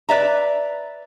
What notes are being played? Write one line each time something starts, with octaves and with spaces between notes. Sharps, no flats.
B4 D5 E5 A#5